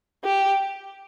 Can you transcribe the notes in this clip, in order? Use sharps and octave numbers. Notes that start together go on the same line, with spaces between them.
G4